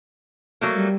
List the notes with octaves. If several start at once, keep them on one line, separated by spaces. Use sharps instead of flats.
F#3 A3 A#3
G3